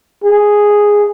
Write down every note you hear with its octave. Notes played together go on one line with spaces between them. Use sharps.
G#4